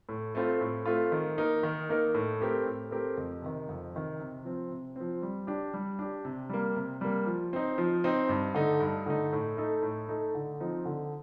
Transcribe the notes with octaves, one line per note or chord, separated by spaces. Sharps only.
A2
A3 C4 F4
A2
A3 C4 F4
D#3
A#3 D#4 A#4
D#3
A#3 D#4 A#4
A2
A3 C4 G4 A#4
A2
A3 C4 G4 A#4
F2
C3 D#3
F2
C3 D#3
C3
F3 C4
C3
F3 C4
G3
D4 G4
G3
D4 G4
C3
G3 A#3
C3
G3 A#3
F3
C4 D#4
F3
C4 D#4
G2
D3 A3 D#4
G2
D3 A3 D#4
A2
A3 D#4 A4
A2
A3 D#4 A4
D3
F3 C4 D#4
D3